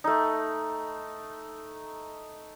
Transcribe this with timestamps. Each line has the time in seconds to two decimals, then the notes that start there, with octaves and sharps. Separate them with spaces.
0.04 A3 D#4